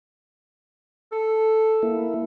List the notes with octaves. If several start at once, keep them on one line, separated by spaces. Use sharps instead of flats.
A4
A#3 E4